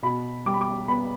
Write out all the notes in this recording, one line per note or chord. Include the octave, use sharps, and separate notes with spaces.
B2 B5
G3 D6
B5
D6
B3 B5